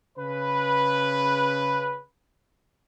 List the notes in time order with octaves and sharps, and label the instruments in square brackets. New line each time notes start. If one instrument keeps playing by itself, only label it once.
[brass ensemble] C#3 B4